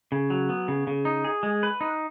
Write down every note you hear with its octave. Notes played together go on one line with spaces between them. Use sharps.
C#3
F#3
B3
C#3
C#3
D#4
G#4
G#3
B4
D#4